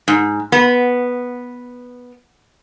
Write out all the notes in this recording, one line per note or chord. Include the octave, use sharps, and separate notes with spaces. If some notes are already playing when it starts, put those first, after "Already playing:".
G#2
B3